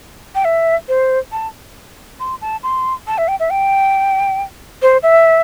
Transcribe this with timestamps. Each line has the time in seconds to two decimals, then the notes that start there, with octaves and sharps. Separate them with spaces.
0.35 G5
0.45 E5
0.88 C5
1.32 A5
2.20 C6
2.41 A5
2.63 C6
3.07 A5
3.18 E5
3.28 G5
3.40 E5
3.50 G5
4.82 C5
5.03 E5